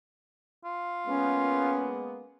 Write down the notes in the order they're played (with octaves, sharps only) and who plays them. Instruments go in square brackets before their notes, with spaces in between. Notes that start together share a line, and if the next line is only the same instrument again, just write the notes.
[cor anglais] F4
[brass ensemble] G#3 A#3 B3 [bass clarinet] C#4